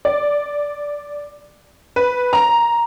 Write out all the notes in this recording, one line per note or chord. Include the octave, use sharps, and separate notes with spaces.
D5
B4
A#5